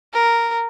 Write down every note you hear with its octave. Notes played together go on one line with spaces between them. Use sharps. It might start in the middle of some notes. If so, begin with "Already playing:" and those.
A#4